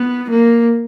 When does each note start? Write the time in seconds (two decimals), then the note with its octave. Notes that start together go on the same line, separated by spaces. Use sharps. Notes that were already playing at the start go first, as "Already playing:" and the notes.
Already playing: B3
0.30 A#3